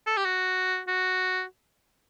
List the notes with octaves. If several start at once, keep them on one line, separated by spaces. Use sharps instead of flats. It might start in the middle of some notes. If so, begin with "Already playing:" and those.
A4
G4
F#4
F#4